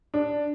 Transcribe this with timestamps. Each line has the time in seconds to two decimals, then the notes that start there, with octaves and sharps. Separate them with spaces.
0.14 D4